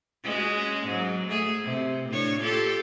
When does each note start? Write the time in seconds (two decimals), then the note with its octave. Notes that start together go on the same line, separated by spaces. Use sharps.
0.24 G#3 C#4 F#4
0.86 G#2 F#3
1.27 A3 G#4
1.64 C3
2.09 A2 D4 C#5
2.41 F4 G4 A4